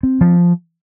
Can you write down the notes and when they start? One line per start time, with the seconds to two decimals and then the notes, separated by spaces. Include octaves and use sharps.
0.03 C4
0.21 F3